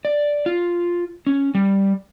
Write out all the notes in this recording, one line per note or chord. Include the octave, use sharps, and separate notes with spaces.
D5
F4
C#4
G3